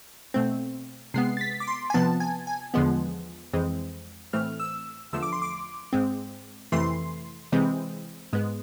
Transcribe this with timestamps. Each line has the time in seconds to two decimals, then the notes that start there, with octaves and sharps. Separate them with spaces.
0.34 B2 A3 C4
1.14 C3 G#3 B3 C7
1.37 A6
1.41 B6
1.60 D6
1.67 C6
1.90 G#5
1.94 C3 F3 B3 A5
2.20 G#5
2.47 G#5
2.74 E2 D3 F3 G#3 B3
3.53 F2 E3 G#3 C4
4.33 A2 E3 A3 C4 F6
4.60 E6
5.13 E2 D3 F3 A3 E6
5.22 D6
5.33 C6
5.42 D6
5.93 G#2 G#3 C4
6.72 F2 C3 E3 A3 C6
7.52 C3 E3 G#3 C4
8.33 G#2 G#3 B3